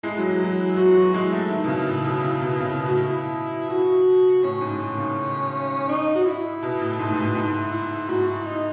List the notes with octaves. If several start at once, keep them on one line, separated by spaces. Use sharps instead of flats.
G#3 E4
F#3
E3
F#3
F#3 F#4
E3
G#3 E4
A3
D#3
B2
C#3
A2
B2
C#3
B2
C#3
B2
A2 F#4
B2 E4
F#4
A2 C#4
G#2
A2
D#3
C#3
D#4
F#4
E4
B2
A2
G#2
G#2
A2
G#2 E4
E4
G#2 F#4
E4
D#4